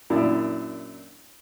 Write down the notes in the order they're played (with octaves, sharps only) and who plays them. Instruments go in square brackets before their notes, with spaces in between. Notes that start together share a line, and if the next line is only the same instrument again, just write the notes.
[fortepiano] F#2 A#2 D4 E4